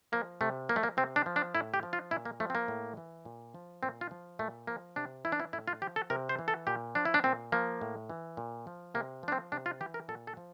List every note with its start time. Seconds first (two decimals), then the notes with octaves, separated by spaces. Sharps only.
0.12 F3 A#3
0.41 C3 A3
0.69 F3 A#3
0.76 A3
0.83 A#3
0.97 C3 C4
1.16 D4
1.26 F3
1.36 D4
1.55 A2 E4
1.74 G4
1.83 F3
1.93 F4
2.11 A#2 E4
2.25 A#3
2.40 F3 A3
2.50 C4
2.55 A#3
2.68 A2
2.97 E3
3.25 A#2
3.55 F3
3.83 A#2 C4
4.01 F4
4.11 F3
4.39 A#2 A3
4.67 F3 A#3
4.96 C3 D4
5.25 E3 E4
5.32 D4
5.40 E4
5.53 A2 E4
5.68 F4
5.82 F3 G4
5.96 A4
6.10 C3 A#4
6.29 C5
6.39 E3
6.48 A4
6.67 A#2 G4
6.95 F3 D4
7.05 E4
7.14 D4
7.24 A#2 C4
7.52 F3 A#3
7.81 A2
8.10 E3
8.37 A#2
8.67 F3
8.95 C3 A#3
9.23 F3 D4
9.32 C4
9.52 C3 D4
9.66 F4
9.81 E3 G4
9.94 A#4
10.08 A#2 A4
10.27 A4
10.37 F3